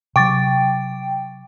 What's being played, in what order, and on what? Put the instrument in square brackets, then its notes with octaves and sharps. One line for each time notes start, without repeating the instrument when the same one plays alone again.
[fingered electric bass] C3 F#3 [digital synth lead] G5 [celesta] C#6 D6 A6